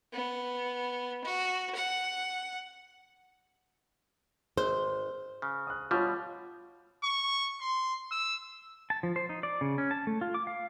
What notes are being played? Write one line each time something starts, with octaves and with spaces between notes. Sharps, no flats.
B3
F#4
F#5
G#1 C5
C#3
D#6 F#6
B2 G3 F4 C#5
C#6
C6
E6
A5
F3
C5
D#4
D5
C#3
C#4
A5
A3
F4
D6
F5